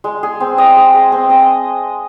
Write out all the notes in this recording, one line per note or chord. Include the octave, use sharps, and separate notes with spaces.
G#3
G#4
C4
D#5
G#3
G#4
C4
D#5